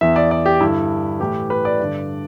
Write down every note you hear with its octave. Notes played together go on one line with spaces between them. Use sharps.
E2 E3 E5
D5
D5
G4
G2 D3 E4
A2 E3 G4
B4
D5
G2 D3